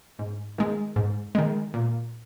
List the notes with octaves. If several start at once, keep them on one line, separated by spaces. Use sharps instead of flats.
G#2
D#3 G#3
G#2
D#3 G#3
A#2